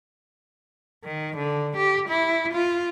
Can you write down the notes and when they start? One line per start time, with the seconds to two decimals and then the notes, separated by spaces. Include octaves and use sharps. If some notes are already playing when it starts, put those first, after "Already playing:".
1.05 D#3
1.37 D3
1.77 G4
2.09 E4
2.54 F4